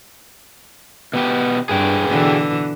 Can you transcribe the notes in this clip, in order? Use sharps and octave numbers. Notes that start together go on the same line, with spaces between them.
B2 B3 G4
G2 G#4 B4 G5
B2 D3 E3